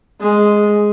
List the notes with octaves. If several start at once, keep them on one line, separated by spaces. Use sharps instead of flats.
G#3